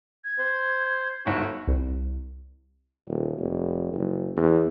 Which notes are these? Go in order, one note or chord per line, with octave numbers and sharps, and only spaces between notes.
G#6
C5
G1 D2 G#2 F#4 F#5
C2
D#1
F1
F#1
E2